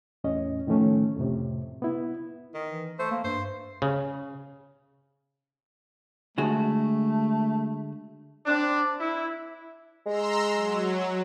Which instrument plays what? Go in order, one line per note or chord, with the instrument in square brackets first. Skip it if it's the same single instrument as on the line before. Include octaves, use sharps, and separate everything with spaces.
[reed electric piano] E2 A2 C#4 D#5
A2 D#3 F3 A3 C#4
F2 A2 C3
B3 E4
[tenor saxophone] D#3
[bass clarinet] E3
[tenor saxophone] A3 [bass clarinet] C5
[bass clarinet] A#3
[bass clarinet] G2 [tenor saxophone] C5
[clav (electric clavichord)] C#3
[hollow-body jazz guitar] D3 G#3 F#4 [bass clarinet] A3
[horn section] C4 D4
E4
[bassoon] G#3 [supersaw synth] A#5 C6 E6
[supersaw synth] F#3